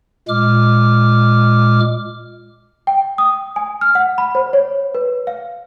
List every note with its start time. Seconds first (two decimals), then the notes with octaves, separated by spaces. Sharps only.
0.28 A#2 G#3 D6 F6
2.87 G5
3.18 D#6
3.56 G#5
3.81 F6
3.95 F#5
4.18 B5
4.35 C5
4.53 C#5
4.95 B4
5.27 F5